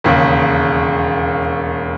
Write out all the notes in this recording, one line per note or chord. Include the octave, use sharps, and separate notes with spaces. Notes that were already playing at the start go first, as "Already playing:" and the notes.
E1 D#2 C#3